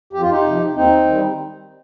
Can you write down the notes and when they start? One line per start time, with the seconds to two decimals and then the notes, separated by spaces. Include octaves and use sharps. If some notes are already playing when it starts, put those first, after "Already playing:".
0.13 F2 G4
0.22 F4
0.30 D#4 G4
0.44 C3 F3
0.75 D#2 C4 D#4
1.07 D#3 G3